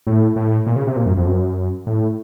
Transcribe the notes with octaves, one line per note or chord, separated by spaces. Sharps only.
A2
A2
A#2
C#3
C3
A#2
F#2
F2
F#2
A2